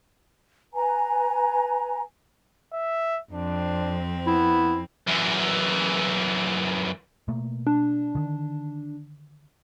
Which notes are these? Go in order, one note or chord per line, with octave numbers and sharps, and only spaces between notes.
B4 G#5 A#5
E5
F2 C4 D4
B3 E4
F#2 E3
B2 A3 A#3
D4
D3 D#3